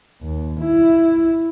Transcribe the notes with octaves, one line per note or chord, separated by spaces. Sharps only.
D#2
E4